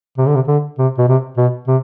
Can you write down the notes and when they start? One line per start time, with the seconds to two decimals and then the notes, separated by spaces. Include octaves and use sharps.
0.18 C3
0.27 D3
0.35 C3
0.48 D3
0.78 C3
0.98 B2
1.08 C3
1.37 B2
1.68 C3